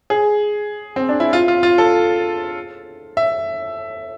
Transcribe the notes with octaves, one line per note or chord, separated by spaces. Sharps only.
G#4
C4
D4
E4
F4
F4
F4
A4
E5